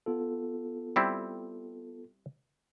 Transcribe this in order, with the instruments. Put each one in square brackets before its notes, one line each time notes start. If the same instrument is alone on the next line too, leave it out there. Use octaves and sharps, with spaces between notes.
[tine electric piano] B3 F4 A4
[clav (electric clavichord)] G3 C4 E4